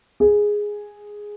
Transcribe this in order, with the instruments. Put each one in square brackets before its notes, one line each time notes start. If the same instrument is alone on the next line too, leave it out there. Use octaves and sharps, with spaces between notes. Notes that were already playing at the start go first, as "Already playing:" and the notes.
[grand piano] G#4